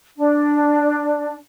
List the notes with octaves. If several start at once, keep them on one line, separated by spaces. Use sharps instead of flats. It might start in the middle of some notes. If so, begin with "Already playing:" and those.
D4